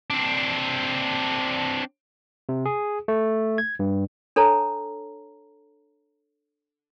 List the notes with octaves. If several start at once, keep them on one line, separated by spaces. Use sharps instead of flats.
C4 D4
C3
G#4
A3
G#6
G2
D4 A4 C#5 A5 A#5